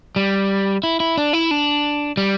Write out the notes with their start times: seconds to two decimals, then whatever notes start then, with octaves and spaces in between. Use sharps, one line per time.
0.16 G3
0.84 E4
1.00 E4
1.17 D4
1.33 E4
1.51 D4
2.17 G3